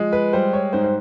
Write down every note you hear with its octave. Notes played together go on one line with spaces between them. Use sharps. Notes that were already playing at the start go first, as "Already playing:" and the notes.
Already playing: F3 G#3
B4
G3 C5
C#5
G#2 C5
C5